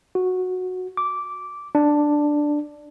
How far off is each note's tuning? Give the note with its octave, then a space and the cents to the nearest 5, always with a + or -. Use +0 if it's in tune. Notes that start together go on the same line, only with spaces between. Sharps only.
F#4 -10
D6 -10
D4 +5